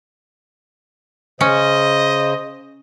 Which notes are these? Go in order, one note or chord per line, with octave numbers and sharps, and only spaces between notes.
C#3 C#4 C5 D#5